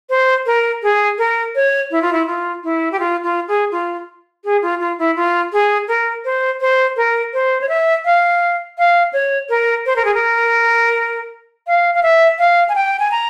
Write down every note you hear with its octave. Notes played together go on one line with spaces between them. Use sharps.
C5
A#4
G#4
A#4
C#5
E4
F4
E4
F4
E4
G4
F4
F4
G#4
F4
G#4
F4
F4
E4
F4
G#4
A#4
C5
C5
A#4
C5
C#5
E5
F5
F5
C#5
A#4
C5
A#4
G#4
A#4
F5
F5
E5
F5
G#5
G5
G#5
A#5